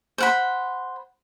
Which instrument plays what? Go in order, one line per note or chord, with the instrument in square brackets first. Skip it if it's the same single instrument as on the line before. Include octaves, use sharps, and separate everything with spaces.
[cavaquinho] C5 F#5 B5